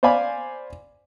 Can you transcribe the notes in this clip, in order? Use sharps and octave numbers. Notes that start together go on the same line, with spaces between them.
C5 D5 F5 G#5 B5 D6